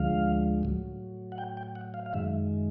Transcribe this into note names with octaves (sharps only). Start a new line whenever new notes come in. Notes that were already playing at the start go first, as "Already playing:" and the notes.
Already playing: D2 D3 F3 G#3 F5
A2 F#3
F#5
G5
G5
F#5
F5
F5
F#2 D#3 G#3 E5